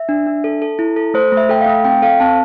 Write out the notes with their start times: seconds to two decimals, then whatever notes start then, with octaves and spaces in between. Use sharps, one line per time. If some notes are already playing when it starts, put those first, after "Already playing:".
Already playing: E5
0.09 D4
0.27 D4
0.44 A4
0.62 A4
0.79 E4
0.96 A4
1.14 A3 C5
1.32 A3
1.37 E5
1.49 A4 G5
1.61 F5
1.66 A3
1.85 C4 G5
2.02 A4 F5
2.20 C4 A5